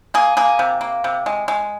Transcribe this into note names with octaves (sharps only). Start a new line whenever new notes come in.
A#3 G#4
A#3 G#4
C3
A#3
C3
G#3
G#3